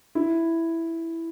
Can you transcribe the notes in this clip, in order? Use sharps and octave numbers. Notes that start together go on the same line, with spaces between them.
E4